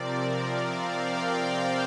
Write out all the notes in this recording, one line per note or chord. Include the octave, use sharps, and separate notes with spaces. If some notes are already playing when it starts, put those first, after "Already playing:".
Already playing: C3 F3 C4 A#4 D5
D5
F5
G5
F5
C5